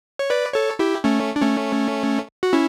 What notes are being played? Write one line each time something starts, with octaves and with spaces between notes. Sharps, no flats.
C#5
B4 D5
A4 C#5
E4 G4
A3 C#4
D4
A3 C#4
F#4
C#4 E4